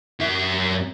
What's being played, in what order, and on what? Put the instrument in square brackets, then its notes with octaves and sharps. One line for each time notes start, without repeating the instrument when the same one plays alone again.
[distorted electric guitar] F#2 E5